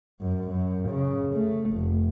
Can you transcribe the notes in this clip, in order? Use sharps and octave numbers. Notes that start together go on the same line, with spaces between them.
F#2
F#2
C#3
A3
F1